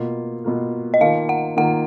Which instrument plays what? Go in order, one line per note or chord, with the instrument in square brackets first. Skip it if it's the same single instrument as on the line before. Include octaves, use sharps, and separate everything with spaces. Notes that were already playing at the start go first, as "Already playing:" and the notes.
Already playing: [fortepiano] B2 A#3 F4
B2 A#3 F4
[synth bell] D#5
[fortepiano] D#3 A#3 F4 [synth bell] F5
[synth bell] F#5
[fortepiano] D#3 A#3 F4 [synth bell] F#5